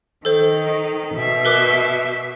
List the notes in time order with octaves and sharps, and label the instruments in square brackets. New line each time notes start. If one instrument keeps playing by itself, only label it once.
[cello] D#3 [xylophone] A4 C5
[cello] B2 E5
[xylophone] A#4 B4 D6